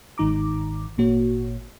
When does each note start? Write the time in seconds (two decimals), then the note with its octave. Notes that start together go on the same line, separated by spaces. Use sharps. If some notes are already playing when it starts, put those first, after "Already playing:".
0.18 G1 G#2 D#3 D#4 A#5 D6
0.98 G#1 A#2 A#3 F#4 C#5